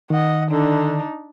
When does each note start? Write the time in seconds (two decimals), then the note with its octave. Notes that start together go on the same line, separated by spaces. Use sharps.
0.10 D#3 D#5 F#5
0.50 D3 D4 D#4